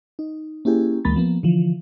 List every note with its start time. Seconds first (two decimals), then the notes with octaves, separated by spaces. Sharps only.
0.19 D#4
0.65 A#3 C#4 E4 G4 G#4
1.05 D2 E3 G#3 A#3 B5 A6
1.16 F3 A#3 B3
1.43 D3 E3 F3